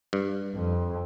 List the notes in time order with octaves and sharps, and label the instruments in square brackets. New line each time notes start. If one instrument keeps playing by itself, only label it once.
[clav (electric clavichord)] G2
[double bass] F2